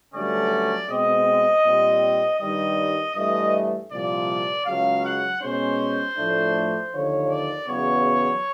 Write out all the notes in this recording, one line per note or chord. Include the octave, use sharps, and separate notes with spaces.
G2 D3 F#3 A3 C#4 D5
B2 G#3 C4 D#5
A#2 G3 C4
G2 D#3 G3 D#5
G2 E3 A3 D#5
C2 A#2 F3 D5
C#2 C#3 F#3 F5
F#5
B2 G#3 C#4 C5
A2 F3 A3 D4
D#2 D3 F3 C#5
D5
E2 C#3 F#3 B3 C#5